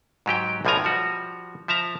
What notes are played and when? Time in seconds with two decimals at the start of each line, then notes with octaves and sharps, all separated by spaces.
0.26 G#2 F#3 G4 G5
0.65 B1 A2 F3 F#3 G#5 A#5
0.84 F3 G3 F#4
1.68 F3 E5 A5 A#5